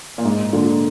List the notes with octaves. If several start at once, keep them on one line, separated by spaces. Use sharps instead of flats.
A#2
G#2
A#2 D3